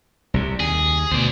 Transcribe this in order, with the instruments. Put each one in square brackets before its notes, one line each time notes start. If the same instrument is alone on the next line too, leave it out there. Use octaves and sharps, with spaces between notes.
[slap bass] C2 C3
[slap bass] D#2 [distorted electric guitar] G#4
[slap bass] D2 B2 [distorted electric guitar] C5 D5